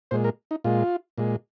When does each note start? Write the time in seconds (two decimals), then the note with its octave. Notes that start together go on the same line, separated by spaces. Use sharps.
0.11 A#2 G#3 C5
0.24 A#4
0.51 D#4
0.64 A#2 G#3 F4
1.18 A#2 G#3